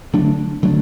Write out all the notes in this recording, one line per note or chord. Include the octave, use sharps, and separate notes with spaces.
D3 F#3 A3 D4
D3 F#3 A3 D4